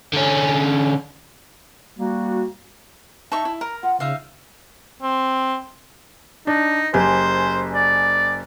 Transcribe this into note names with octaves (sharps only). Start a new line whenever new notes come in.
D3 C#4
G3 A#3 F#4
D#4 E5 A5 C#6
E4
A#4 A#5
F4 F#5
C#3 D#4 E5 F5
C4
D4 D#4
F#1 G4 C5 G#5
D5